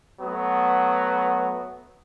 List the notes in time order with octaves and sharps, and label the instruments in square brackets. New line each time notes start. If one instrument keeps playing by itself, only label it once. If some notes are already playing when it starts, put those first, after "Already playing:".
[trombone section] F#3 A3 B3